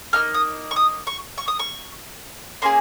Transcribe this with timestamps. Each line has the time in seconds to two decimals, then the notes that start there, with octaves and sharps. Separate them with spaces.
0.13 A#3 D#4 F6
0.34 D#6
0.71 C#6
0.76 D#6
1.07 C#6
1.38 C#6
1.48 D#6
1.59 C#6
2.62 A#3 C#4 G#4 C6